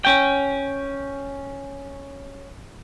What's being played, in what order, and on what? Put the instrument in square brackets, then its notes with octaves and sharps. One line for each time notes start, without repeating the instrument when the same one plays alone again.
[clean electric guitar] C#4 G5